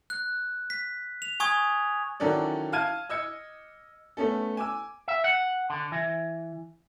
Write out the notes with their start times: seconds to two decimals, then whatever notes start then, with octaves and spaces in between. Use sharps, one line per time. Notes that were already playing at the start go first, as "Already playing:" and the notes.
0.10 F#6
0.70 B6
1.22 F7
1.40 G#5 C#6 D#6 G#6
2.20 D#3 E3 F#3 C#4 A4 D5
2.72 F5 A5 F6 G#6 D#7
3.09 D#5 E6 G#6 C#7
4.17 A3 B3 C#4 A4
4.57 G#5 D6 E6
5.08 E5
5.24 F#5
5.70 D3
5.92 E3